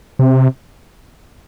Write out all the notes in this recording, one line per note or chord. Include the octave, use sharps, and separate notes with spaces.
C3